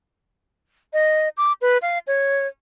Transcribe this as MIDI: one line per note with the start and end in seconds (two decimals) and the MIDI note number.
0.93 1.29 75
1.37 1.53 86
1.61 1.78 71
1.82 1.99 77
2.07 2.47 73